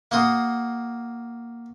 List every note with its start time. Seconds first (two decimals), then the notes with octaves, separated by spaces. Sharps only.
0.11 A#3 F#4 C6 D#6